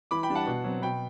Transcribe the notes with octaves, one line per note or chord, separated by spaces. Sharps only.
E3 B5 D6
G5 B5
G3 D4
F#5 A5
B2
F#3 C4
B2 G5 B5